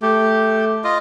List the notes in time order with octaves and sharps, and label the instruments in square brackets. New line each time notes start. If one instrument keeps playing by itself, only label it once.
[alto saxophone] A3 [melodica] G4
[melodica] F4 D#5